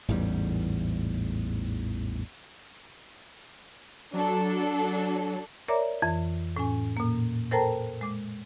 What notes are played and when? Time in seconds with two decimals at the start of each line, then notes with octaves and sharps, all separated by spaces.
0.08 A1 E2 G#2 G3
4.13 F#3 D4 A4
5.68 A#4 C#5 D5 E5 A#5 D6
6.02 F2 E3
6.56 A2 C#4 G#5
6.97 A#2 A#3
7.51 A4 A#4 C5 G5 A5 A#5
8.01 G#3 D6